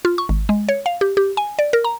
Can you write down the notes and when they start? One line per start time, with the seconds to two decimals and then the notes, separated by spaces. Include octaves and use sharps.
0.05 F4
0.18 C#6
0.29 G#1
0.49 G#3
0.69 C#5
0.86 F5
1.01 G4
1.17 G4
1.37 G#5
1.59 D5
1.73 A#4
1.84 A#5